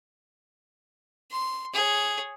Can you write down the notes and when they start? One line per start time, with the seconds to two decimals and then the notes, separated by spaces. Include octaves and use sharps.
1.31 C6
1.73 G#4 C#5